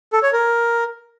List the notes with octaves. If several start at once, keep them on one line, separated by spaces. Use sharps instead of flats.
A4
C#5
A#4